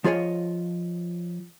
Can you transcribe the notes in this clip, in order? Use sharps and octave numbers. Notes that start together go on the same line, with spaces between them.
F3 F4 G#4 C#5 D#5